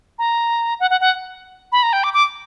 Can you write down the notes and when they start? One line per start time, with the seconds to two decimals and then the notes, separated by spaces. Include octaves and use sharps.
0.19 A#5
0.80 F#5
0.90 F#5
1.01 F#5
1.72 B5
1.83 A#5
1.93 G5
2.04 D6
2.14 D6